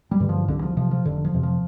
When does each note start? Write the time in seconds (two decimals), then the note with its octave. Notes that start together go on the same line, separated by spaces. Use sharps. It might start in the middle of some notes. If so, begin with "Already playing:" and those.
0.11 G3
0.20 G2 D3
0.29 F3
0.48 C2 D3
0.62 F3
0.77 C3 F3
0.91 F3
1.05 F1 D3
1.24 F3
1.34 F2 C3
1.43 F3